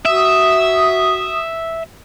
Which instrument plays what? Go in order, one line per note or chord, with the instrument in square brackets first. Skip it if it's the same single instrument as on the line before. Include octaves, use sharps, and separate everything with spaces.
[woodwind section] F#4 D#6 [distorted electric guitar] E5